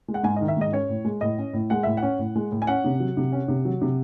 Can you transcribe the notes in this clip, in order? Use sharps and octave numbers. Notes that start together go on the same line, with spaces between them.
G#3
F#5
G#2 G#5
D#5
D#3
E5
G#2 D#5
C#4 C#5
A2
G#3
A2 D#5
C#4
A2
G#3 F#5
A2 E5
F#5
C#4
A2
G#3
A2
G#5
C#4 F#5
C3
F#3
C3
C#4
C3
F#3
C3